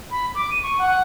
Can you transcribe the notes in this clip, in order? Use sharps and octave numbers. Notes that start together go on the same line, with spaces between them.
B5
D6
D#7
C#6
F#5